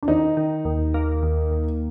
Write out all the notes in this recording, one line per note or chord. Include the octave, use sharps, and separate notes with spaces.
D4
D#3 D#4
D#3
D#2
A#3
D#2
D#2